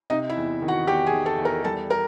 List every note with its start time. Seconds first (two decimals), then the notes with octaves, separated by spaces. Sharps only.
0.10 C3 D#4 D#5
0.29 E4 E5
0.36 E2
0.62 D#3
0.68 F#4 F#5
0.87 E2 G4 G5
1.06 G#4 G#5
1.13 D#3
1.26 A4 A5
1.38 E2
1.45 A#4 A#5
1.64 G3 A4 A5
1.90 A#4 A#5